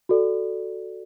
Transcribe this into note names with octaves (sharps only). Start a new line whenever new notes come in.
F#4 A4 D5